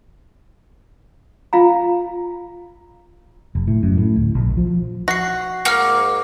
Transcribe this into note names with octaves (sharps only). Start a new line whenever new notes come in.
F4 F5 A#5
F1
A2
F#2
A2
D1
A#1
F3
F#4 A#6 C7
G#2 A#3 A#4 F#5 F6